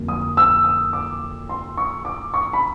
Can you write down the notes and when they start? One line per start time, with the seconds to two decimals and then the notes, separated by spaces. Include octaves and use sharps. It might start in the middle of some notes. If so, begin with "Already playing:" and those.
Already playing: F2 D3 F#3 A#3
0.08 D#6
0.37 E6
0.64 D#6
0.93 D6
1.49 C6
1.77 C#6
2.05 D6
2.34 C#6
2.53 B5